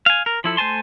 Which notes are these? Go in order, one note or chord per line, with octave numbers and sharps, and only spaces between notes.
F5 G#5
A#4
F3 E4 A4
A3 C5 G#5 A5 C6